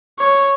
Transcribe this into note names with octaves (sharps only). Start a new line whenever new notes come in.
C#5